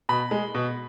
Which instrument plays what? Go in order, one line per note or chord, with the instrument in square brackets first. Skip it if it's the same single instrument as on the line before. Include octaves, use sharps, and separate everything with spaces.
[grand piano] B2 B5
G#3
B2